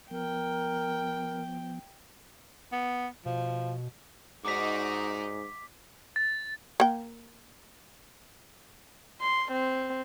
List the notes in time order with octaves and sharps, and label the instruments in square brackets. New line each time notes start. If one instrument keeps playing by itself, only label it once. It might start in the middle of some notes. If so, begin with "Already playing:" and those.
[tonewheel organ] F3 B3 [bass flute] A#4 [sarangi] G5
[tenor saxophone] B3
[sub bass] B2 [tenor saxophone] F3
[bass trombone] G#2 [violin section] D#4 F#4 D5 [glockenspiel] D6 B6
[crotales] A6
[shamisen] A#3 G5
[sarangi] C6
C4